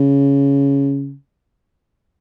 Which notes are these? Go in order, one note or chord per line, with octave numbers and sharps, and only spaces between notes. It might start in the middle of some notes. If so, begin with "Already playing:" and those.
Already playing: C#3